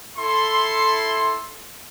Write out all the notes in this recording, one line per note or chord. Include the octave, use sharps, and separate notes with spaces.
E4 A4 C6